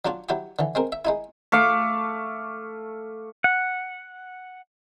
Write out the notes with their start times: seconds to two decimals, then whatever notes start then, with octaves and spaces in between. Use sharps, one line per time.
0.05 F#3 D4 F4 F#4
0.29 F#3 E4 F#4 G4
0.59 D3 E3
0.75 G#3 C4 A#4
0.92 E5
1.05 G#3 D#4 E4
1.52 A3 F5 D6
3.44 F#5